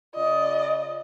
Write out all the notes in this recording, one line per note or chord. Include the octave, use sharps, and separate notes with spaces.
C#3 F4 D5 D#5